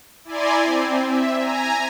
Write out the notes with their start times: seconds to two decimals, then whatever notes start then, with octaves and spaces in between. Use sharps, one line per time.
0.25 E4 D5 G#5 A#5 C6
0.63 C4
1.04 E5
1.39 G#5 A#5